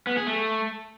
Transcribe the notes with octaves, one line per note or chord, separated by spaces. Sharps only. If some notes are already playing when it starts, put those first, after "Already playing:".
B3
G#4
A3